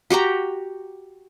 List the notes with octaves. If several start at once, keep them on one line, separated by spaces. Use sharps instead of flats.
F#4 G4 G5 A#5